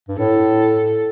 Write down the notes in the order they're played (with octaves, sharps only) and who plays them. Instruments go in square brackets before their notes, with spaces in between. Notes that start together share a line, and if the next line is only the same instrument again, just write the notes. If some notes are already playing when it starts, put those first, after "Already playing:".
[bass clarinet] G2
[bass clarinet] A2 [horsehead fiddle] A4